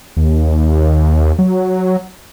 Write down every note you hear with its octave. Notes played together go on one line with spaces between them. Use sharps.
D#2
F#3